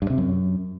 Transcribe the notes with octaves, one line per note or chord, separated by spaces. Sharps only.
G2
C3
F#2